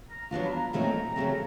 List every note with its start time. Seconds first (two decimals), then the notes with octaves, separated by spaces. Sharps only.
0.10 A#5
0.31 F#3 B3 D4 F4 A#5
0.43 B5
0.53 A#5
0.73 A#2 F#3 A3 C4 D#4
1.16 C#3 F#3 A3 C4